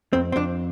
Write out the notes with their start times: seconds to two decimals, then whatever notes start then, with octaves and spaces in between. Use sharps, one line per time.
0.13 F2 C4
0.32 C4
0.36 F2 D4